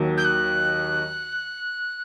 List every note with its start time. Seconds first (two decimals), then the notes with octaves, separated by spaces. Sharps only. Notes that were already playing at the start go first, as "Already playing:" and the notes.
Already playing: D#2 D#3 F#3
0.17 G6
0.24 F#6